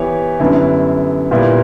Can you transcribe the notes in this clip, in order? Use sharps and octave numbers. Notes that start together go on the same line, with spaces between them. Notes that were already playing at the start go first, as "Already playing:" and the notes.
Already playing: E3 B3 E4 G4 C#5
F#2 D3 G3 B3 E4
A#2 G3 B3 E4